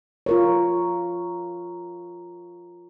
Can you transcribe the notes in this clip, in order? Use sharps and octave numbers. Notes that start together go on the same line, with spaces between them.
F4 A#4 C#5